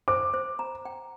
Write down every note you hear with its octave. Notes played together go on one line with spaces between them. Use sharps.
C5 D6
C5
A#5
G5